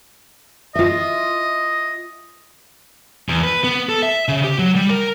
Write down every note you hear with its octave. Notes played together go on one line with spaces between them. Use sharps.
F4 D#5 E5
E2
B4
B3
A4
E5
C#3
G4
F#3
G3
A#4